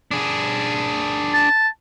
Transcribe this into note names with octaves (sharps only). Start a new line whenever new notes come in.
D4 G#4
A5